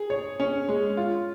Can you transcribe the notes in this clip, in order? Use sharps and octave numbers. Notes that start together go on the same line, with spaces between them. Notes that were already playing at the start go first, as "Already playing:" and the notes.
Already playing: G#4
C#5
C#4
G#3
F4